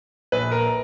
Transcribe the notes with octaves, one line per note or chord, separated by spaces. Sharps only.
A#1 B4
A#4